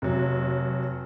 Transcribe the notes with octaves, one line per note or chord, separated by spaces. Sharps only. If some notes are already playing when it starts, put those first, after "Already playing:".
F1 F#3